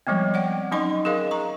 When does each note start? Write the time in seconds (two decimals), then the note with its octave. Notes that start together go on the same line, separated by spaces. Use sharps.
0.07 F3 G3 G#3 B3 C4
0.34 D5 F#5 G5
0.71 F#3 C#4 D#4 D#5 C6 C#6
1.05 G#4 A#4 D#5 F5
1.31 A#5 C#6